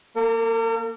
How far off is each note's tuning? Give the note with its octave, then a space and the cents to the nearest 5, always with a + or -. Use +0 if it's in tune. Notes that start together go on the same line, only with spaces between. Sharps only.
A#3 +0 A#4 -45